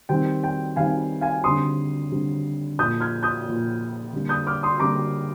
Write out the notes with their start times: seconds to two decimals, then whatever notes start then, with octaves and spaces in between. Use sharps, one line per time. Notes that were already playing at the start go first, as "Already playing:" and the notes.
0.09 D#3 G3 C4 G5
0.44 G5
0.76 D#3 G3 C4 F5 G#5
1.21 F5 G#5
1.44 D3 G3 C4 C6 D#6
2.11 D3 G3 C4
2.79 A#2 F3 A#3 D#6 G6
3.01 F6 G#6
3.23 D#6 G6
3.45 A#2 F3 A#3
4.12 D3 G3 A#3
4.29 D#6 G6
4.47 D6 F6
4.63 C6 D#6
4.80 D3 G3 A#3 A#5 D6